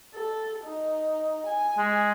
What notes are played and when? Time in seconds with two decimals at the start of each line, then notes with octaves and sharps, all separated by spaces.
0.14 A4
0.64 D#4
1.46 G#5
1.78 G#3